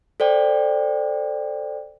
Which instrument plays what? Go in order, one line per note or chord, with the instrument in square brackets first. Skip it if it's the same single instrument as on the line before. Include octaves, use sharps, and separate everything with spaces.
[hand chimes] A4 C5 D5 G5